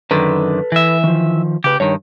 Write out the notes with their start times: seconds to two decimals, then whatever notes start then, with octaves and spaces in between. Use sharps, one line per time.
0.11 F#2 D3 D#3 A4 B4
0.72 E3 E5
1.04 D#3 F3
1.64 C#3 G4 B4
1.80 G2 D#3 C#5